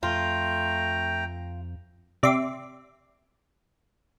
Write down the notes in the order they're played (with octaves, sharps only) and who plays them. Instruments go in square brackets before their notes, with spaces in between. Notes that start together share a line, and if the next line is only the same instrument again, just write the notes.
[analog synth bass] F2 [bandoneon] A3 A#5 [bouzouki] F4 [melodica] G5
[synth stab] C3 D5 E5 C6 D6